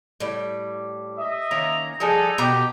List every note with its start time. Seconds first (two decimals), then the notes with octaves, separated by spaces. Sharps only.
0.20 A2 G3
1.18 D#5 E5
1.51 D#3 A#3 C#4 A#5
2.00 F3 G3 G#3 D#4 A4 G#5
2.38 B2 G4 A#5